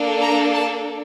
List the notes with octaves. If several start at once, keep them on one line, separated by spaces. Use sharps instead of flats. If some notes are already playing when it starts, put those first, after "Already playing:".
Already playing: A#3 D4 A4
A#5
A5